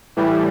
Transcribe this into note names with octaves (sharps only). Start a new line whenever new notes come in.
A2 E3 G3